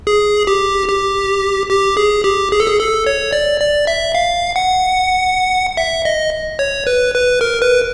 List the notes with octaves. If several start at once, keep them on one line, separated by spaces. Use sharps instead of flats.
G#4
G4
G4
G4
G#4
G4
G#4
A4
G#4
A4
C#5
D5
D5
E5
F5
F#5
E5
D#5
C#5
B4
B4
A#4
B4